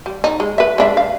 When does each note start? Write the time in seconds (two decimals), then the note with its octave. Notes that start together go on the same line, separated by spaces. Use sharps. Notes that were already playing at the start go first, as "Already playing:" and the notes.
0.06 G3
0.24 D#4
0.40 G#3
0.58 B4 E5
0.78 G#3 D4 E5
0.97 F5